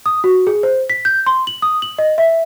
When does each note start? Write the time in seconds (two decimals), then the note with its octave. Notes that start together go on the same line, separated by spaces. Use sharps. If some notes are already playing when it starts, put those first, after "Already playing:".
0.06 D#6
0.24 F#4
0.47 G#4
0.63 C5
0.90 B6
1.05 G6
1.26 C6
1.47 F#7
1.62 D#6
1.82 F#7
1.98 D#5
2.18 E5